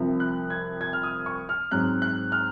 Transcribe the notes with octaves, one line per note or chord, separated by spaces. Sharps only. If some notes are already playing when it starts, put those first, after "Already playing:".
Already playing: C2 C3 F3
F#6
G#6
G#6
F6
D#6
C#6
F6
G#2 F#3 C4 F#6
F#6
F6